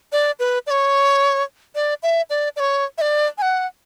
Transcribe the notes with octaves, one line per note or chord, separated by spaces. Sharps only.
D5
B4
D5
C#5
D5
E5
D5
D5
C#5
E5
D5
G#5
F#5